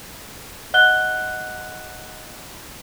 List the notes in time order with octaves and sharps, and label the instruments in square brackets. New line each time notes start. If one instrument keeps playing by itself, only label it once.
[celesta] D#5 F#5 F#6 G7